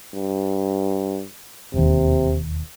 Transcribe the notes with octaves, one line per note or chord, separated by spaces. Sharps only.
G2
E1 D#2 C3